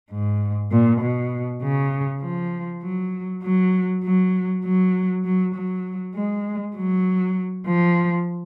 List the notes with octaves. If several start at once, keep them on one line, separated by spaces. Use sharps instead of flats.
G#2
A#2
B2
C#3
F3
F#3
F#3
F#3
F#3
F#3
F#3
G#3
F#3
F3